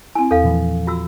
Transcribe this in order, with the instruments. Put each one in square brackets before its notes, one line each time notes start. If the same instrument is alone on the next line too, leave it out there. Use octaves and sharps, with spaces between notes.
[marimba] C4 E4 [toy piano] G#5
[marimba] E2 [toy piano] A4 F5
[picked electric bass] A#2 E3 F3
[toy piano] F4 F#4 E6